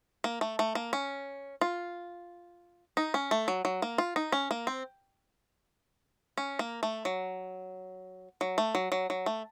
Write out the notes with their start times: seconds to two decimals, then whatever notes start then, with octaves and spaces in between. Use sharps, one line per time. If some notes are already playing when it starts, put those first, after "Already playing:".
0.24 A#3
0.41 A3
0.59 A3
0.75 A#3
0.93 C#4
1.61 F4
2.97 D#4
3.14 C#4
3.31 A3
3.48 F#3
3.65 F#3
3.82 A#3
3.98 F4
4.16 D#4
4.32 C#4
4.51 A#3
4.67 C4
6.38 C#4
6.59 A#3
6.83 A3
7.05 F#3
8.41 F#3
8.58 A3
8.75 F#3
8.92 F#3
9.10 F#3
9.26 A3